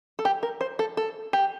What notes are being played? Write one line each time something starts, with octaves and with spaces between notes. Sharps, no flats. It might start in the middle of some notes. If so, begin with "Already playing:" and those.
A4
G4
A#4
C5
A4
A4
G4